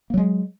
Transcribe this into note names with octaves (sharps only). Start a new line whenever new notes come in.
F#3 G#3 A#3